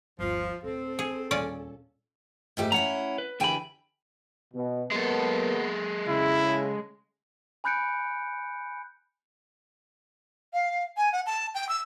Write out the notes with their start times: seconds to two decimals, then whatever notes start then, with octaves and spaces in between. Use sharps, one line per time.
0.19 G1 D#2 F3 F4
0.64 D1 C4 A4
0.99 G#4
1.31 D#2 A#2 G3 C#4 D5
2.57 G#2 A3 G4
2.72 C#4 E4 F#5 A#5
3.18 B4
3.40 D3 E3 G4 G5 G#5 B5
4.54 B2
4.91 F#3 G#3 A#3 B3 A4
6.08 C#3 E4
7.64 G#5 B5 F#6 G6 C#7 D7
10.53 F5
10.97 G#5
11.12 F#5
11.26 A5
11.54 G5
11.68 E6